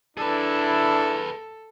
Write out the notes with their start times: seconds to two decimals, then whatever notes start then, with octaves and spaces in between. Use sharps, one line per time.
0.17 D4 E4 G#4 A4 B4